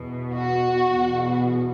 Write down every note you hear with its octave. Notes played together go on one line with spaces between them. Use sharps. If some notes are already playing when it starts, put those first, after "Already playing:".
Already playing: E2 B2
F#4
E2 B2